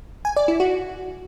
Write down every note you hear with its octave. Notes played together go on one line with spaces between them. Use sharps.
G#5
D5
E4
F#4